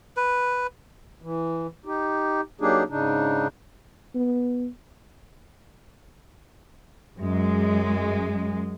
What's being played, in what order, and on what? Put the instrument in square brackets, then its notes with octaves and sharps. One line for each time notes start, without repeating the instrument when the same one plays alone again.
[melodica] B4
[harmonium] E3
D#4 G4
F#3 A#3 D4 D#4 G4 G#4
G#2 C#3 D4 D#4
[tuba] B3
[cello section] F#2 G#3